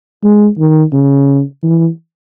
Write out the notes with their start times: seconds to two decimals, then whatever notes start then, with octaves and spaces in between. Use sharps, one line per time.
0.24 G#3
0.59 D#3
0.93 C#3
1.63 E3